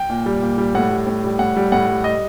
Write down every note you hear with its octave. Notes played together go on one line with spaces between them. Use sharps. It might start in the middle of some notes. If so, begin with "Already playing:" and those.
Already playing: G5
A#2
G3
A#2
G3
A2 F#5
G3
A2
G3
A2 F#5
G3
A2 F#5
G3
D#5